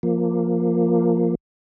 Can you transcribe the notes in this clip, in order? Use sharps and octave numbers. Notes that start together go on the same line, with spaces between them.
F3 A#3